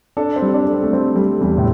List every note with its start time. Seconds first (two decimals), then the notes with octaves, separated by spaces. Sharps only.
0.17 D4 A4
0.36 C4
0.42 G3
0.54 D4
0.66 A4
0.73 C4
0.83 A3
0.92 G3 C4
1.16 G3
1.41 E2 G3
1.58 A2